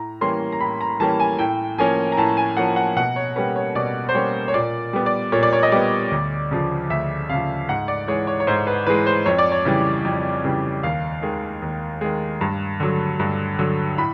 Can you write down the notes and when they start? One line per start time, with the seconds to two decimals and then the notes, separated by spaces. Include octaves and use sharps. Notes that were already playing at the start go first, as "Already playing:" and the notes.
Already playing: A2 A#5
0.21 E3 G3 A#3 C#4 C6
0.52 A#5
0.60 A2 B5
0.81 A#5
1.00 E3 G3 A#3 C#4 A5
1.20 G#5
1.39 A2 G5
1.78 F3 A#3 C#4 G#5
2.12 A#5
2.17 A2 A5
2.37 G#5
2.57 F3 A#3 C#4 F#5
2.76 F#5
2.96 B2 F#5
3.16 C#5
3.36 G3 A#3 C#4 B4
3.56 C#5
3.75 B2 D5
4.09 C5
4.14 G3 A#3 C#4 C#5
4.48 C#5
4.54 A#2 D5
4.93 G3 B3
5.06 D5
5.32 A#2 C#5
5.43 D5
5.53 C#5
5.63 D#5
5.72 G3 B3 D5
6.11 D2
6.51 C#3 F3
6.90 D2 E5
7.29 C#3 F3 F5
7.68 G#2 F#5
7.88 D5
8.08 E3 G#3 C#5
8.27 C#5
8.40 C#5
8.47 G#2 C5
8.67 B4
8.86 E3 G#3 B4
9.06 C5
9.26 F2 C#5
9.38 D5
9.52 C#5
9.65 C#3 E3 G3
10.05 F2
10.44 C#3 E3 G3
10.83 D#2 F5
11.22 D#3 G#3
11.62 D#2
12.01 D#3 G#3
12.41 G2
12.80 D3 F#3
13.19 G2
13.59 D3 F#3
13.98 A2 B5